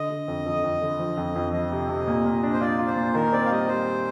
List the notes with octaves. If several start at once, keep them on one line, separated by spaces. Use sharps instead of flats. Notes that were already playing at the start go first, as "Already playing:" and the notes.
Already playing: D3 D#5
D3
F2
F2
F2
D3
F3
F2
F2
F3 D#5
C3
C3
A#2
A#2
D4
C5
F4 D5
F4
C5
A#2
D#3 A#4
C4 D5
F5
G3 D#5
G3 C5